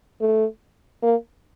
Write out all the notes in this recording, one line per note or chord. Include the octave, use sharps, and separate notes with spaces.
A3
A#3